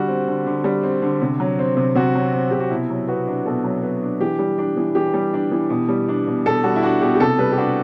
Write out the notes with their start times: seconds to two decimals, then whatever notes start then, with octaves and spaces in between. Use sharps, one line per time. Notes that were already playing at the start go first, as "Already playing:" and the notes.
Already playing: D3 G3 F#4
0.08 C4
0.27 D3
0.46 D3
0.64 G3
0.83 C4
1.02 D3
1.22 C3
1.40 F#3
1.59 C4
1.77 C3
1.95 C3 F#4
2.15 F#3
2.33 C4
2.51 C3 G4
2.60 F#4
2.70 B2 E4
2.90 F#3
3.08 B3 F#4
3.27 D4
3.46 B2 A4
3.64 F#3
3.83 B3
4.02 D4
4.21 E3 G4
4.39 G3
4.58 D4
4.77 E3
4.95 E3 G4
5.14 G3
5.34 D4
5.51 E3
5.70 B2
5.89 G3
6.08 D4
6.27 B2
6.46 B2 A4
6.63 G3 F#4
6.76 E4
6.83 D4 F#4
7.01 B2 G4
7.15 G4
7.20 C3 A4
7.38 G3 B4
7.52 G4
7.57 D4 F#4